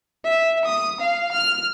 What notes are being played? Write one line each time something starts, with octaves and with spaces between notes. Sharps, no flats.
E5
D#6
F5
F6